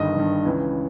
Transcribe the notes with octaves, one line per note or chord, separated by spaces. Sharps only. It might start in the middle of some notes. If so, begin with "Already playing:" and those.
Already playing: G1 G2 D#3 D#5
G1 G2 D#3
C#2 C#3 E3